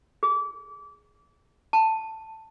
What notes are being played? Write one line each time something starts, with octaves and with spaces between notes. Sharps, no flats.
G#4
A5